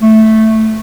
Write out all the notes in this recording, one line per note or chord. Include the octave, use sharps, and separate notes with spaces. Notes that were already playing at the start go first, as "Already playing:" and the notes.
A3